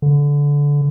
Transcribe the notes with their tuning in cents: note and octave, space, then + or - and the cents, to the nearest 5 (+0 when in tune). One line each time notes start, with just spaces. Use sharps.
D3 -20